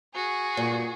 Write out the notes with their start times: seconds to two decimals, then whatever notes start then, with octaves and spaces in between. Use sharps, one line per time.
0.15 F#4 G#4
0.57 G2 A#2